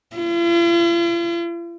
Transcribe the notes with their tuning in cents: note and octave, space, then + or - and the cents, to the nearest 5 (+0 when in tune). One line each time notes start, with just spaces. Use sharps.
F4 -45